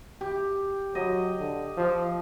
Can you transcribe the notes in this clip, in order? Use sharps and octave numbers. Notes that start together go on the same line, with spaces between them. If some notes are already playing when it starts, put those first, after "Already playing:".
G4
F#3 D#5
D3
F3